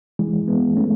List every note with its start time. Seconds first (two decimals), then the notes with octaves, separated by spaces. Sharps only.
0.19 E3 G#3
0.48 G#3 B3
0.77 A3 C#4